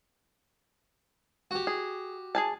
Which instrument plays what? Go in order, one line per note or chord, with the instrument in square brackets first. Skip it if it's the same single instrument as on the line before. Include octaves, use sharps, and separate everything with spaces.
[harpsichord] F#4 G4
[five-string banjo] G#4
G#4 G#5 A5